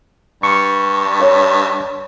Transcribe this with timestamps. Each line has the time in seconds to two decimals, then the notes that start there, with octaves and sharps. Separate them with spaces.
0.43 G2 C#6
1.20 A#4 C#5